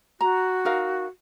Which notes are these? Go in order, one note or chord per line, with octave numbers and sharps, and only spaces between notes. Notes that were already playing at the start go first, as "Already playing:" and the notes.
F#4 A#5
D#4 A#4 F5